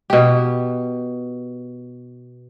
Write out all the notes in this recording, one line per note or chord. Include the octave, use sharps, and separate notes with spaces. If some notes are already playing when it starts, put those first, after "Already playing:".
B2 G4